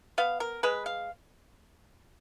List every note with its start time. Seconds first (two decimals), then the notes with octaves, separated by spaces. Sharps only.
0.18 B3 F5
0.40 A#4
0.63 G#3 B4
0.86 F5